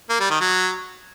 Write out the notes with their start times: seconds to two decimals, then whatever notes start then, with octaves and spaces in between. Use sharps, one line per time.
0.09 A#3
0.20 G3
0.30 D#3
0.40 F#3